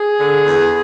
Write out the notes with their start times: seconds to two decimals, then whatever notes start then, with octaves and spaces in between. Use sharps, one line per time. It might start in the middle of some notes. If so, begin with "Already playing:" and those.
Already playing: G#4
0.19 D3
0.45 E2